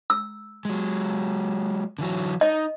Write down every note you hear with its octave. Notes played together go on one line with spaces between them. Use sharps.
E6
F#3 G#3
D3 E3 F#3
D#4 D#5